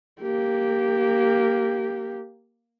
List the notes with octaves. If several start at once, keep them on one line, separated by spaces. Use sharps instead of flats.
A#3 G4